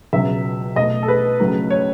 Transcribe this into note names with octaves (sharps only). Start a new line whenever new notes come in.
C#2 B2 F#3 E5
B2 A3 D#5
A4
B4
C#2 C#3 F#3 A3
C#5